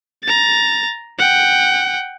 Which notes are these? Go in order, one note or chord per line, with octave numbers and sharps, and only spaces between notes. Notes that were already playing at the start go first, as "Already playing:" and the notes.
A#5 A6
F#5 G5